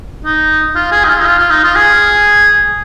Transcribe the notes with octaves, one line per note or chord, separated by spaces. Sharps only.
D#4
F4
G#4
D#4
F4
D#4
F4
F4
D#4
F4
G#4